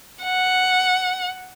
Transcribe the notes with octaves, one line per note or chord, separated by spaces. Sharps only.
F#5